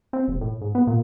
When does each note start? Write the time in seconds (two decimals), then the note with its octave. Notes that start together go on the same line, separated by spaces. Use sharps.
0.13 C4
0.28 E1
0.41 A2
0.61 G#2
0.75 B3
0.87 A#2